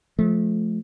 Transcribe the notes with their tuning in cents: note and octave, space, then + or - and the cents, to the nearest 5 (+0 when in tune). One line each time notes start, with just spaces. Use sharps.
F3 +0 A3 -25